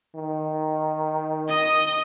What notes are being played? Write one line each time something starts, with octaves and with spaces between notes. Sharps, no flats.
D#3
D#5 D#6